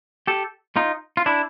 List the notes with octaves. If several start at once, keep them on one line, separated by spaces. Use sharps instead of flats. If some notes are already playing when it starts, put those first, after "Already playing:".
G4 A4
D#4 F4
F4
D4 E4